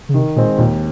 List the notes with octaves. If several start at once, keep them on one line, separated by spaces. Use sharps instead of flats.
C#3
C3 D#3
A#2 G#3 C4
D#2 A#2